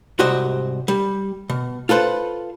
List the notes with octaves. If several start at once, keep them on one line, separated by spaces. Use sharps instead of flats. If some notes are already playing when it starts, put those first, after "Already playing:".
C2 G#2 F#4 G4 C5 D#5
G3
B2
F4 A4 B4 C5